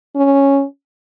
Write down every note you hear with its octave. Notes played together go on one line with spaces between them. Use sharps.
C#4